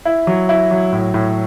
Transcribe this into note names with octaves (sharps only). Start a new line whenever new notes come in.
E4
F#3
E4
F#3
A2
A2